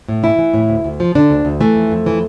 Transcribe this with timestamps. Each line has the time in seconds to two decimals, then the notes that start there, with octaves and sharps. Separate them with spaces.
0.08 A2
0.23 E3 E4
0.38 E3
0.54 A2
0.69 D2
0.84 D2
1.00 F3
1.15 D3 D4
1.30 D2
1.45 D2
1.61 E3 A3
1.75 F2
1.92 F2
2.06 E3